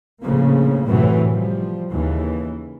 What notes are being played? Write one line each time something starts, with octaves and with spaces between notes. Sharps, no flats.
A#1 A2 C#3 F3 A#3
F#2 A2 C3 E3 F#3
F3 G3
D#2 C#3 E3